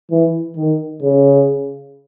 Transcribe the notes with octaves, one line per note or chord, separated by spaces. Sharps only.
E3
D#3
C#3